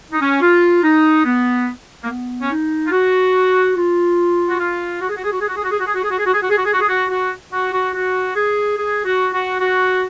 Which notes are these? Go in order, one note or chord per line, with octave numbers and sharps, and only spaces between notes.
D#4
C#4
F4
D#4
B3
A#3
B3
C#4
D#4
F4
F#4
F4
F#4
F4
F#4
G#4
F#4
G#4
F#4
G#4
F#4
G#4
F#4
G#4
F#4
G#4
F#4
G#4
F#4
G#4
F#4
G#4
F#4
G#4
F#4
G#4
F#4
G#4
F#4
F#4
F#4
F#4
F#4
G#4
G#4
F#4
F#4
F#4